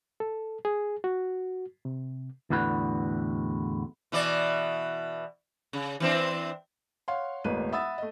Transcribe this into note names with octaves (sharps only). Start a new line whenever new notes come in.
A4
G#4
F#4
C3
E2 A2 D3 F#4 B4
B2 E3 D5
C#3
E3 C4 D4
C#5 F5 F#5 C6
E1 A1 A#3 B4 C#5 D#7
E5 F#5 B5 D#6 E6 A6
A3 D#5